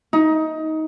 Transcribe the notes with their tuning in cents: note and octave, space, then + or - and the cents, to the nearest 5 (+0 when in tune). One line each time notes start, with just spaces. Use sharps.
D#4 +20